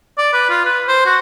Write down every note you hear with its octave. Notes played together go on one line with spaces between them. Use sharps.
D5
B4
F4
B4
C5
F#4